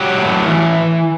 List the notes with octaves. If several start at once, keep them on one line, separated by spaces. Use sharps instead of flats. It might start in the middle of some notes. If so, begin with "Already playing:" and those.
Already playing: F#3 G4
A2
E3